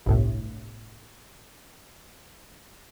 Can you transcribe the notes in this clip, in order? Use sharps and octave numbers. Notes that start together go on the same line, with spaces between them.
G1 C2 A2